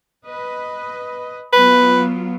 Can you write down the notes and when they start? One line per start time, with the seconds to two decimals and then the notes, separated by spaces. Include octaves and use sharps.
0.24 B4 D#5
1.53 F#3 B3 F4 B4